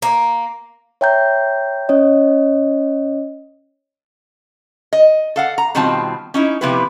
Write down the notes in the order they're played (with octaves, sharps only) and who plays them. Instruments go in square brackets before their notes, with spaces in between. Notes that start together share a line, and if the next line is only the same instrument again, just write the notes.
[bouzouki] A#3
[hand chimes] C#5 E5 G5 A#5 G6
C#4 C#5 D#5
[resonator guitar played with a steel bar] D#5
A4 F5 F#5
A#5
B2 D#3 G3 C4 F4 A5
C#4 D#4 E4
C3 F3 B3 E4 G4 B4